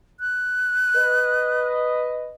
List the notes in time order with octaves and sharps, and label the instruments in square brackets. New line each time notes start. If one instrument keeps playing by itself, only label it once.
[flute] F#6
[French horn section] B4 D#5